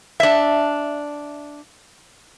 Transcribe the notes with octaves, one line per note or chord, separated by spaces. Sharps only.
D4 E5